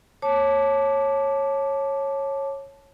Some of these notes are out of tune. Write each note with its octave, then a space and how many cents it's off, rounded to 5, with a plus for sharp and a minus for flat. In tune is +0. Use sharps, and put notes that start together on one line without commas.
C#5 -15 A5 -10 D6 +0